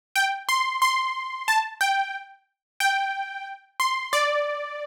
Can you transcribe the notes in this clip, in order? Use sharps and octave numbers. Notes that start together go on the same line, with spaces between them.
G5
C6
C6
A5
G5
G5
C6
D5